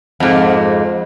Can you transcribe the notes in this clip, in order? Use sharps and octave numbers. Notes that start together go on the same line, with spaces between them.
F2 G#2